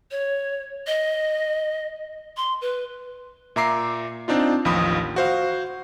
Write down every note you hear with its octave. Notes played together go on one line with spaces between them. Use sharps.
C#5
D#5
C6
B4
A#2 E5 A#5 D6 C7
C4 D4 D#4 F4
A1 D#2 F3 B5 D#6
F#4 C5 F5